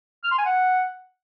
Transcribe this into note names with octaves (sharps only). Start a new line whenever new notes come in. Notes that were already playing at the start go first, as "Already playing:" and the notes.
F6
C6
G#5
F#5